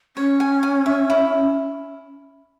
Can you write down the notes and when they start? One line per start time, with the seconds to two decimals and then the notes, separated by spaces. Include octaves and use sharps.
0.17 C#4 C#5
0.40 G#5
0.63 G#5
0.86 E5
1.10 E4